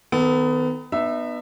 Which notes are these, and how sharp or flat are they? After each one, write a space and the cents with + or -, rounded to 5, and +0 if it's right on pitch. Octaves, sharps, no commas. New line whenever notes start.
D#3 +10 B3 +30 A4 +0
B3 -5 D#4 -40 E5 +0